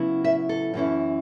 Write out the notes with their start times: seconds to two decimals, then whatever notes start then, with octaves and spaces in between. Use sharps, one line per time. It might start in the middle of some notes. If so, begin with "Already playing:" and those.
Already playing: C#3 F#3 B3 E4
0.24 E5
0.49 A4
0.74 F#2 E3 C#4 E4